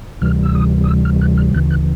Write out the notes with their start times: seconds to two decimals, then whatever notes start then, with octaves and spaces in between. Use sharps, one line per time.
0.21 D2 C3 E3 G3 F6
0.43 E6
0.55 D#6
0.84 D#6
0.89 E6
1.05 F6
1.21 F#6
1.37 F6
1.54 D2 C#3 E3 F#6
1.71 F#6